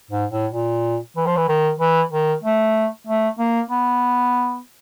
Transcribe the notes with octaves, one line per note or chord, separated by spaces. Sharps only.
G#2
A2
A#2
E3
F3
E3
D#3
E3
D#3
A3
A3
A#3
B3